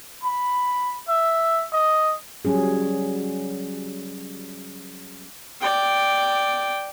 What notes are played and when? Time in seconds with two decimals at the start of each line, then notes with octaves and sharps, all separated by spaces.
0.23 B5
1.09 E5
1.73 D#5
2.45 F#3 G3 C#4 G#4
5.61 D5 G5